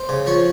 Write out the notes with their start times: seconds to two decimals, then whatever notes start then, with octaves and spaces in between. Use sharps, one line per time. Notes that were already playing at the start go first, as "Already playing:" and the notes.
Already playing: C5
0.09 C#3
0.26 F3 C#5